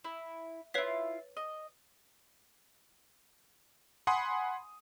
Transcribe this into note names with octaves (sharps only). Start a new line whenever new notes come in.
E4
E4 F4 B4 C#5 B6
D#5
F#5 G#5 B5 C6 D#6